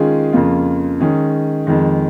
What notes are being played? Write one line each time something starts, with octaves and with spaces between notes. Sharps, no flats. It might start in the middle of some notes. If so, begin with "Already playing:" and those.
Already playing: D#3 G#3 C#4 F4 G#4
F2 C#3 A#3 F4
D#3 G#3 C#4 G#4
F2 D#3 G#3